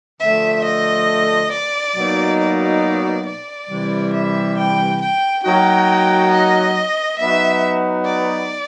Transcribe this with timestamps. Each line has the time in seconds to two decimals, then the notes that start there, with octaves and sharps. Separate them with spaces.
0.20 D3 F3 A3 E5
0.64 D#5
1.51 D5
1.95 B2 F#3 A#3 D#4
2.39 D5
3.25 D5
3.69 C3 E3 G3
4.13 E5
4.57 G5
5.01 G5
5.43 F#3 A#3 D#4 F#4 G5
6.31 D#5
7.19 F#3 B3 D#4 F#4 E5
8.05 D5